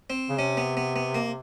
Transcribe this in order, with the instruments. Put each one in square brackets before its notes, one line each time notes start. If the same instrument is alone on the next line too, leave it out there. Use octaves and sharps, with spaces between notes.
[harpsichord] C4
[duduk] C#3
[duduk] C3 [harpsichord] C#4
[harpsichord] B3
B3
B3
A#3